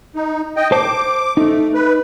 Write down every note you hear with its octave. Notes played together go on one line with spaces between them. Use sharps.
D#4
D#5 G5
C5 A5 D6
A3 D#4
B4